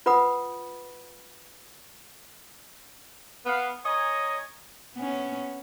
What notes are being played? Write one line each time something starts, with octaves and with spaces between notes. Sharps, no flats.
F4 B4 F#5 B5 D#6
B3 F5
C#5 D#5 G#5 A#5
B3 C#4